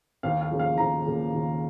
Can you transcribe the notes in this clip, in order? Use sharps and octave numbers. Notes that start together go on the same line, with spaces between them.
D#2 F5
F5
C#3 F3 A#3
F5
D#2 A#5
C#3 F3 A#3
D#2